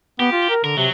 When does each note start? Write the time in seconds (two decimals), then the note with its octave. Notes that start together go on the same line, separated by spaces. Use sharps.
0.20 B3 G4
0.32 F4
0.50 A#4
0.64 D3 A#4
0.77 C3 F#3